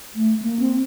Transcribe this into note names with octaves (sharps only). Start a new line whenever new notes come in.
A3
A#3
C4